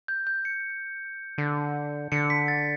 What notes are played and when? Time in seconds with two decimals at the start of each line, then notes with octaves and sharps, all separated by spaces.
0.08 G6
0.27 G6
0.45 C#7
1.38 D3
2.12 D3 C#7
2.30 B6
2.48 A6